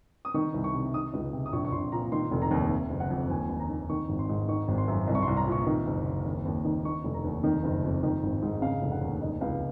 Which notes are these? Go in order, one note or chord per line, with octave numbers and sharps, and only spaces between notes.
D#6
D#3 C#6
C2
C#6
C3
D#3 D#6
C#2
C3
D#6
A#1 C#6
C#6
A#1 C6
A#2 A#5
D#3 C6
F1
A#5
D#2
C3
F#1
F#5
F2
D#2 G#5
D#2
A#5
D#3
D#3 C#6
G#1
C6
G#2
D#3 C#6
G#1
C6
F#2
C2 D#5
C#6
C6
C2
A#5
A#2
C#6
D#3
F#1
F#2
D#2
D#2
D#3
D#3 C#6
F1
A#5
D#2
D#3
F#1
F2
D#3
G#1
G#2
C#3 F5
F1
F#5
D#2
D#3 D#5
C#2 F5